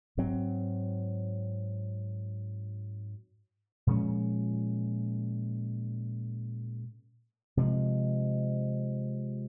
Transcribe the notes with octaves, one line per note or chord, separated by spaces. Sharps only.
G#2 F#3 C4
A#2 F3 G#3 C#4
C3 F3 G#3